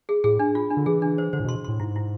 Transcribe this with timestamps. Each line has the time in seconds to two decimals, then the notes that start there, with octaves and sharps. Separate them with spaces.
0.09 G#4
0.24 A2 G#4
0.39 D4
0.55 F4
0.71 D4
0.77 D3
0.86 E3 G#4
1.02 D4
1.18 C5
1.33 D3 C5
1.40 A2
1.45 B2 C6
1.64 A2 C6
1.80 G#2 E4
1.96 E4